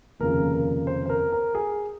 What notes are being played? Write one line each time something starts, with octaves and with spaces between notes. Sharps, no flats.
F1 D#2 C#3 F3 A#4
A#4
C5
C5
A#4
A#4
G#4